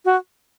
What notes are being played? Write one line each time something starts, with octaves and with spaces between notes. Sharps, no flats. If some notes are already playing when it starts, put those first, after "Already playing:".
F#4